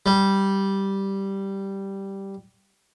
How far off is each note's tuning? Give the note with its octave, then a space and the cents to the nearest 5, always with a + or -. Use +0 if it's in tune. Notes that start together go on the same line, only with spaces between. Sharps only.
G3 -5